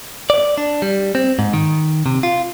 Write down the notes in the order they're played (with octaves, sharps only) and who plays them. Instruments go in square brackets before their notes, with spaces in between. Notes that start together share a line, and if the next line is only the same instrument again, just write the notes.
[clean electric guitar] D5
D4
G3
C4
G#2
D#3
C3
F4